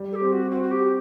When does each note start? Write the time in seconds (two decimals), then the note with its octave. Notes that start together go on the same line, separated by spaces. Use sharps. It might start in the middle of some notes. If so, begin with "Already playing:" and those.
Already playing: G3
0.12 A4
0.15 G4
0.21 C4
0.32 F#4
0.51 C4 F#4
0.63 F#4
0.71 G4